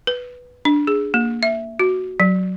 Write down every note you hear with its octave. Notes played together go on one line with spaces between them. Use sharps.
B4
D4
G#4
A#3
E5
F#4
F#3